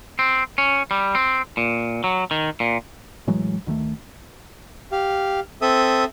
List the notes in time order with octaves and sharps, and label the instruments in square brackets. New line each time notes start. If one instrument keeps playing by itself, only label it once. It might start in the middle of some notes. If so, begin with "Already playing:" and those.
[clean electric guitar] C4
C#4
G3
C4
A#2
F#3
D#3
A#2
[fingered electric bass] A2 E3 F#3 G#3
D2 D#3 F#3 A3
[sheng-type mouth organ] G4 F5
C4 A4 E5 D#6